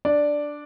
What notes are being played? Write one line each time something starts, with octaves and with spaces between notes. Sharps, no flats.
D4 D5